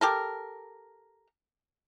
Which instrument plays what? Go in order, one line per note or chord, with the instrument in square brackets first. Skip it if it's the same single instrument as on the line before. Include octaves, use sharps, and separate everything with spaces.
[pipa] G4 A4 A#4